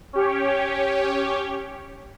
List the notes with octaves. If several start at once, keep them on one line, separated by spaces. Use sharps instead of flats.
C#4 G4 C#5